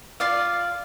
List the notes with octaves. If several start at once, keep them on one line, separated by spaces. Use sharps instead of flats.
F4 D5 F5